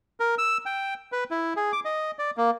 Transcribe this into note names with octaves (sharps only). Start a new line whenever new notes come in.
A#4
E6
G5
B4
E4
G#4
D6
D#5
D5
A#3